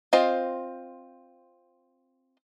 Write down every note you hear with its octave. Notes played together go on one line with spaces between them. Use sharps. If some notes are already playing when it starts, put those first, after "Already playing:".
C4 F4 C5 D#5